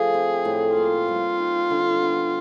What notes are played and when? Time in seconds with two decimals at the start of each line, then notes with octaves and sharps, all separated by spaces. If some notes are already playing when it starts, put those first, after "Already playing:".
Already playing: F3 A3 G#4
0.14 C4
0.45 A2
0.76 A#3 F4
1.08 G3
1.40 D#4
1.70 D3
2.02 B3